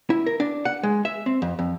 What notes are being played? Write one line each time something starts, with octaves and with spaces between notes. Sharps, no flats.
E4
A#4
D4
F#5
G#3
E5
C4
F2
F2